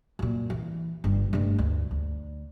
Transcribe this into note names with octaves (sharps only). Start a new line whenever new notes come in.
F#2 A#2
E3
G1 G3
G2 A3
D2
D2